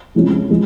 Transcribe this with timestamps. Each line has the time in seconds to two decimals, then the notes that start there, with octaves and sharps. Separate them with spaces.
0.15 C3 F3 G#3 C#4
0.50 F3 G#3